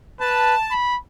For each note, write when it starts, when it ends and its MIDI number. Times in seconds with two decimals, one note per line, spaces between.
0.20 0.55 71
0.20 0.74 81
0.71 0.98 83